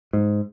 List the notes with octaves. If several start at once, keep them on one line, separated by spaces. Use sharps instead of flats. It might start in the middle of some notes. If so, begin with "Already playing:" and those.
G#2